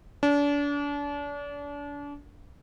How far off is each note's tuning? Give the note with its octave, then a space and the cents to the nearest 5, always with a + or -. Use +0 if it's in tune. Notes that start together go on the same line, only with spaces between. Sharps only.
D4 -35